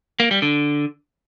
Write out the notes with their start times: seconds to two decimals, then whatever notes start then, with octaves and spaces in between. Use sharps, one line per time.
0.20 A#3
0.31 G3
0.42 D3